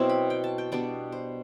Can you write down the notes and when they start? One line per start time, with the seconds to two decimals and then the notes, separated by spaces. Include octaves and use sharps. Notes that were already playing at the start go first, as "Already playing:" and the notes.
Already playing: B2 F#3 C4 E4
0.09 B5
0.30 G5
0.44 A5
0.58 G5
0.72 B2 G3 B3 D4 D5
1.12 C5